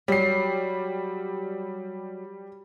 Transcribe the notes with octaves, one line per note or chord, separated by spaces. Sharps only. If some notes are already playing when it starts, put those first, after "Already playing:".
F#3 G3 C7